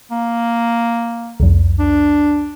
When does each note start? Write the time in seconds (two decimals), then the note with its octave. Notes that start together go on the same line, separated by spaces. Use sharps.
0.11 A#3
1.40 C2 F2
1.79 D4